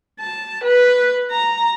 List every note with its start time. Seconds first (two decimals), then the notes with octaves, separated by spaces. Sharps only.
0.20 A5
0.64 B4
1.31 A#5